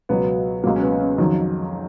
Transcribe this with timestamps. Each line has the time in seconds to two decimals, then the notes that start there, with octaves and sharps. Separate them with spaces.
0.09 C#2 B2 F#3 B3
0.64 C#2 B2 F#3 A#3
0.76 C#4
0.82 B3
1.01 C#4
1.18 F2 D#3 F#3